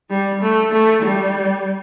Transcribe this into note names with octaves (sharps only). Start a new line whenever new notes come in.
G3
A3
A3
G3